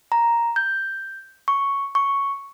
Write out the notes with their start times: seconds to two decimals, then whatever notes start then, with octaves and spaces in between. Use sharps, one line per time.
0.12 A#5
0.56 G6
1.48 C#6
1.95 C#6